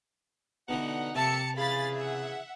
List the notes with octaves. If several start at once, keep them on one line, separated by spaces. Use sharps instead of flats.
B2 D3 E3 D#4 F#5
F2 C3 A#3 G4 E5 A5 C#7
C#3 E3 G#4 F5 B5 A6
E5 F#5